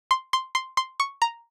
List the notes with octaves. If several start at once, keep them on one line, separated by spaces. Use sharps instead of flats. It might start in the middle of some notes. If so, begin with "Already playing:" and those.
C6
C6
C6
C6
C#6
A#5